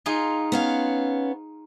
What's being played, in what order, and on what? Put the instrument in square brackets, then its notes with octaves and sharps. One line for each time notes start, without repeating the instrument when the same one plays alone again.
[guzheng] D#4 F4 G#4
[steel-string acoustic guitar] B3 C#4 F5